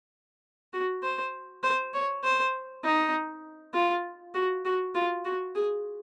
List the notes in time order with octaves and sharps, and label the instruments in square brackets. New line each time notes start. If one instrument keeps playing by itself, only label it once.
[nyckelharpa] F#4
C5
C5
C#5
C5
D#4
F4
F#4
F#4
F4
F#4
G#4